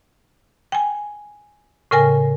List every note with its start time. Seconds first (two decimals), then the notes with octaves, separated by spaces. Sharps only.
0.72 G5 G#5
1.91 A2 C#3 A#4 G5 G#5 A#6